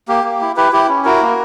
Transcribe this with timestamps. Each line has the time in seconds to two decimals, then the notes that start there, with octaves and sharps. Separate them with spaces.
0.08 A#3 G4
0.24 A#3
0.41 E4
0.56 E4 G4 B4
0.72 E4 G4
0.89 C#4
1.05 E4 F#4 A#4
1.22 A#3